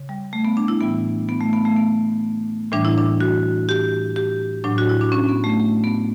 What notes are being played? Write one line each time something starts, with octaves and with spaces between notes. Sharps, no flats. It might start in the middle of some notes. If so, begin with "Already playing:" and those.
Already playing: C#3
G3
A3
B3
D4
E4
A2 E3 G3 B3
B3
A3
B3
A3
B3
A2 E3 G3 D4
E4
D4
F#4
G4
G4
A2 F#3 D4
F#4
E4
D4
C#4
B3
A3
A3
B3